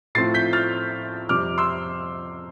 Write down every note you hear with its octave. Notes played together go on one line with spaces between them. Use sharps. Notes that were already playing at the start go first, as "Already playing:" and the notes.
A2 F3 A3 C4 F4 A6 C7
G6 B6
F6 A6
F2 C3 G3 C4 D6 F6
C6 E6